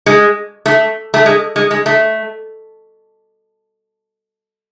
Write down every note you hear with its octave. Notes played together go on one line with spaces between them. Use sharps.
G#3
A3
A3
G#3
G#3
G#3
A3